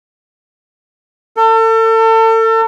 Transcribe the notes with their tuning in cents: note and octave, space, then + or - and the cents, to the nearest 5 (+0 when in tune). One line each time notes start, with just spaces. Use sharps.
A4 +35